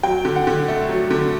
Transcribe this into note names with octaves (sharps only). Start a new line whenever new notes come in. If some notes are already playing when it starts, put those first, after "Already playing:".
F#3 G5
D3
F#5
D3
A3
F#3
D3